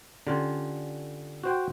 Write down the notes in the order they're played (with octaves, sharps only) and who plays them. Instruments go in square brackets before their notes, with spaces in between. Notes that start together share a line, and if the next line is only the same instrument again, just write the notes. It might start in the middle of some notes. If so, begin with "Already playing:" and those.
[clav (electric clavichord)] D3 [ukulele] C#4 F4 G4
[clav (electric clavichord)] F#4 C5 G5